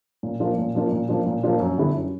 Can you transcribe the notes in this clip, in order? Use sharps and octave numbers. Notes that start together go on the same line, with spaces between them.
A#2
F3 A#3 D4 F4
A#2
F3 A#3 D4 F4
A#2
F3 A#3 D4 F4
A#2
F3 A#3 D4 F4
F#2
D3 G3 B3 E4
F#2